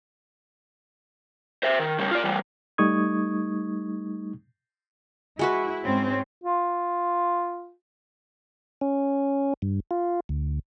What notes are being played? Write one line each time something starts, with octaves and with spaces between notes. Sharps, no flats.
C5 E5
D#3
C#3 G3
F4 D5
E3 G3
G3 A3 D#4 C#6 D#6 G#6
G#3 E4 F#4 B4
G#2 C4 C#4
F4
C#4
G2
F4
D2